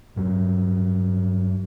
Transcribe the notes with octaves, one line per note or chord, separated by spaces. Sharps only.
G2 F#3